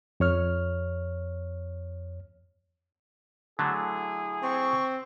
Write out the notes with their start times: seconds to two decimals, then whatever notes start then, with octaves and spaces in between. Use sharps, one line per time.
0.20 F2 C#5 F6
3.59 D3 F#3 A3 E4 G#4
4.43 C4 C#6